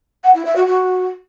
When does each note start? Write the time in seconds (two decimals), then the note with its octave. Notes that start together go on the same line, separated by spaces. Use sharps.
0.24 F#5
0.34 E4
0.45 E5
0.56 F#4
0.66 F#4